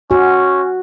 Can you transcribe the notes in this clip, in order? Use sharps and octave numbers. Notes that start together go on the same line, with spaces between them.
C#4 F#4